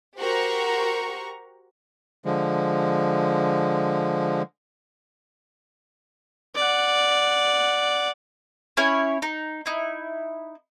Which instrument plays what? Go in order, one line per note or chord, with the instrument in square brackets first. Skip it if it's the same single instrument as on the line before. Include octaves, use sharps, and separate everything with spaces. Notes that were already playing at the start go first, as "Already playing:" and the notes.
[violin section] F#4 G4 A#4 C5 A#5 C#6
[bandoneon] D3 F3 G#3
[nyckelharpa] D5 F#5
[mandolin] C#4 E4 C#5 G#5
D#4
D#4 E4